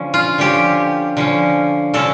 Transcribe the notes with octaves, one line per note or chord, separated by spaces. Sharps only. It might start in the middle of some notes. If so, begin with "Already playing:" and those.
Already playing: D3 F3 C#4
F4
D3 F3 C#4 G4
D3 F3 C#4
D3 F3 C#4 A4